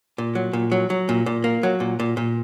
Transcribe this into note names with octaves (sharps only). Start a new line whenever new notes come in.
A#2
F#3
A#2
F#3
F#3
A#2
A#2
A#3
F#3
A#2
A#2
A#2